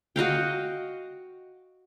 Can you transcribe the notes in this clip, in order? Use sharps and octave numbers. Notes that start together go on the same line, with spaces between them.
F#4 D#5 F5 G5